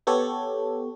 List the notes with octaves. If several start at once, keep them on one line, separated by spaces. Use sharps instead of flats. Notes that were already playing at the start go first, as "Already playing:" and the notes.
B3 G4 A4 C#5